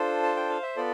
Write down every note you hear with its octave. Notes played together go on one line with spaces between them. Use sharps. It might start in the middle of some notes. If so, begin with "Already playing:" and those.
Already playing: D4 F4 A4 C5
A5
G5
F5
E5
B3 F4 A4 D5